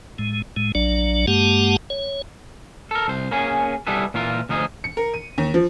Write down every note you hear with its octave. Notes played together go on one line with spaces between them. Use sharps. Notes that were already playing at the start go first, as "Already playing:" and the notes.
A2 G#3
A2 G#3
A#1 F#3 D4 D5
G2 G#3 A#3 G4 F#5 A5
C#5
A4 A#4
C2 C5
A#3 C#4 G#4
G3 B3 E4 G#4 A4 B4
A#2 E3 F4 A#4
D2 F3 D#4 G#4
C#7
A#4
D#7
D#2
F3